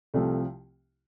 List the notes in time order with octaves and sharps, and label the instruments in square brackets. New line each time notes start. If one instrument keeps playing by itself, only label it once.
[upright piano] C2 C3 F3 A3